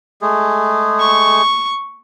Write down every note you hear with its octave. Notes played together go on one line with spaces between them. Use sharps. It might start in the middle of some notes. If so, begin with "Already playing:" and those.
G#3 A3 G#4
C#6